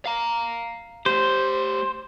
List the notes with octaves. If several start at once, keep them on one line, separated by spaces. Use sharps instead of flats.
F5 A#5
A3 G4 C5